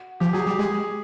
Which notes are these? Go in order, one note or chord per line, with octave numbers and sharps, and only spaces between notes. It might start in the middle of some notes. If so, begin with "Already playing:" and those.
Already playing: F#4
F3 G4
F#3 G#4
G3 G4
G#3 G#4